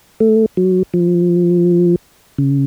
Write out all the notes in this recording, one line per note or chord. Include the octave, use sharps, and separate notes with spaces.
A3
F#3
F3
C#3